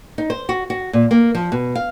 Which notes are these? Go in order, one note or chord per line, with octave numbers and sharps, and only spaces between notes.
D#4
C5
F#4
F#4
A#2
A#3
F3
B2
F5